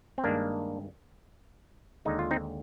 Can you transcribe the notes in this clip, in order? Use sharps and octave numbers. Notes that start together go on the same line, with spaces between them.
C4
G2 D#3 G#3 A#3 D4
D#2 D3 G#3 D#4
F4
C4 D#4